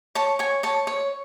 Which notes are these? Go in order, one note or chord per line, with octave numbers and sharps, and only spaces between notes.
C#5 A5
C#5 G#5
C#5 A5
C#5